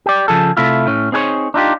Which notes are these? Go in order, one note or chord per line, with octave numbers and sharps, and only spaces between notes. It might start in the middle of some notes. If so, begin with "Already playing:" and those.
G4 D5
C#3 F3 G#4 A4
C3 A3 E4 F4
A2 C#4
C4 D#4 G#4 A#4 C#5
D4 D#4 F4 G4